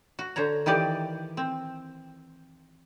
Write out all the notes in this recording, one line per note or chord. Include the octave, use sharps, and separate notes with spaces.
F#4
D3 C5 C#5 A#5
D#3 E3 G4 D5
C4